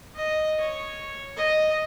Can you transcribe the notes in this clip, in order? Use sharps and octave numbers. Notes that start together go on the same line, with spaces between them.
D#5
C#5
D#5